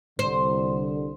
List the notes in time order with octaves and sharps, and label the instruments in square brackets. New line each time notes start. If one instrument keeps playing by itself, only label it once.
[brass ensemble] C2 D3 [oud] C5